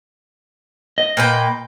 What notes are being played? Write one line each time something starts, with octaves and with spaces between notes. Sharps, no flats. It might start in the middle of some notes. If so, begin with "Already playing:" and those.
D#5
A#2 B4 G5